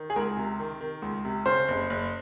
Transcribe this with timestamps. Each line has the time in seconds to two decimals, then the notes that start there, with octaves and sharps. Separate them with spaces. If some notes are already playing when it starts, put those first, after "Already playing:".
Already playing: D#3
0.10 G#4
0.16 C#2 A#4
0.37 C3
0.59 D#3
0.81 D#3
1.02 C#2
1.25 C3
1.46 C#3 C5
1.68 F#1
1.90 F#1